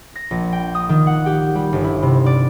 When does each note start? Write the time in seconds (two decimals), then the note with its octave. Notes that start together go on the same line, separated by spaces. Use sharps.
0.15 A#6
0.31 A#1
0.52 G5
0.75 D#6
0.89 D#3
1.07 F#5
1.26 G4
1.55 G3
1.73 G1
1.84 E4
2.02 C3
2.26 D5